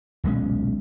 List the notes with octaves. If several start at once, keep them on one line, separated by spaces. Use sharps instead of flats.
D#1 B1 G#3 C#4